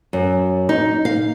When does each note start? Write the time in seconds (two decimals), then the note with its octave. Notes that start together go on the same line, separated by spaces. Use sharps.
0.13 F#2
0.69 D#4
1.05 F5